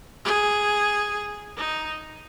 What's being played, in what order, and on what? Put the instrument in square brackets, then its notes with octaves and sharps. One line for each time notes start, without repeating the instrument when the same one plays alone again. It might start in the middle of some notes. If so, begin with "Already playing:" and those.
[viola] G#4
D#4